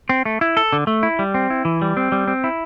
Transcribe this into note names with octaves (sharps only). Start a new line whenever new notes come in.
C4
A3
E4
A4
D3
A3
E4
G3
C4
E4
E3
G3
C4
G3
C4
E4